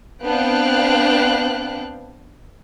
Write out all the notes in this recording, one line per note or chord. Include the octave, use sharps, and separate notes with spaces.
B3 C4 D4 F5 G5 F#6